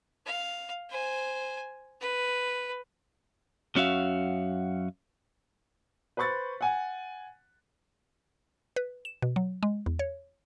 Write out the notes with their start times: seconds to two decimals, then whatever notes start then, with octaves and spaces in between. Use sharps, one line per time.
0.26 F5
0.90 C5 G#5
2.01 B4
3.76 F#2 C#4 F#4 E5 F5
6.17 B4 C5 B5 C#6 A6
6.61 F#5 G#5
8.76 B4
9.05 E7
9.22 B2
9.36 F#3
9.63 G#3
9.86 E2
9.99 C#5